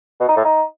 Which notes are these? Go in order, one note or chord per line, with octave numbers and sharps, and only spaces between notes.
B2
D#4
A2
D#4